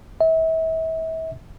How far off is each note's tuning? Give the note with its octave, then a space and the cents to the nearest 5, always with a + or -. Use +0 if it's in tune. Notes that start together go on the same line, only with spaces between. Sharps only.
E5 -35